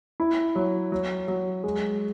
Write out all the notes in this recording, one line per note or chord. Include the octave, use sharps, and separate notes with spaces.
E4
F#3
F#3
F#3
G#3